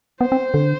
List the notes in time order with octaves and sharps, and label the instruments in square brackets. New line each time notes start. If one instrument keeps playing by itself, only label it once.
[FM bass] B3 [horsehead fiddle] C5
[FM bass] C4
D3